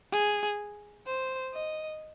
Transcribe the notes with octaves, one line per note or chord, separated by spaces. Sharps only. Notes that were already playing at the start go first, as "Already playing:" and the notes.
G#4
C5
D#5